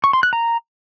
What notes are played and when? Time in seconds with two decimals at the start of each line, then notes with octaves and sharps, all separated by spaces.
0.04 C#6
0.13 C6
0.23 F#6
0.33 A#5